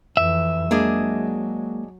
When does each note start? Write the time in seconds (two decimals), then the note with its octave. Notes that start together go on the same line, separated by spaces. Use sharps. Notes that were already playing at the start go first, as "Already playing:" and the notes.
0.17 F2 E3 E5
0.71 F#3 G#3 A#3 D4 G#4 D#5